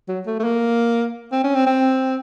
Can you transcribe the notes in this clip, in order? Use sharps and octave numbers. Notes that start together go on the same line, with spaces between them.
F#3
A3
A3
A#3
C4
C#4
C4
C4